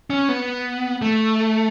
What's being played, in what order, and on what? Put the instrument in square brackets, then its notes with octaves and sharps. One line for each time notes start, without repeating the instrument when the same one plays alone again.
[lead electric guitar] C#4
B3
A3